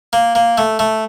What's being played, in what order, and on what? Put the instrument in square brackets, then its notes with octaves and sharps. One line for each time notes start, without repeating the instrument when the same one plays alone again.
[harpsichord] A#3
A#3
A3
A3